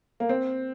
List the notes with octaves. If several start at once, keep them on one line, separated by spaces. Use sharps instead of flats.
A#3
C4